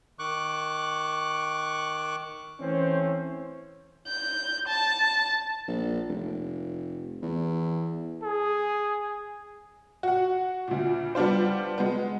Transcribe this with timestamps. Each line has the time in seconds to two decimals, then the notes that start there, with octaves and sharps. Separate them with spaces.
0.19 D#3 C#6 D6 F#6
2.61 E3 A3 C4 C#4 C5 C#5
4.08 G6
4.68 A5
5.68 A#1
6.09 F1
7.22 E2
8.24 G#4
10.03 F#4 F#5
10.68 D2 A#2
11.15 G3 B3 D4 F4 C5
11.78 G#3 B3